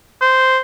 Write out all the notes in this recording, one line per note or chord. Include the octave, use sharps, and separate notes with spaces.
C5